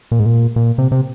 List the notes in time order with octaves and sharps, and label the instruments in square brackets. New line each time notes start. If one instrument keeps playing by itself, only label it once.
[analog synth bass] A#2
G#2
A#2
A#2
C3
C3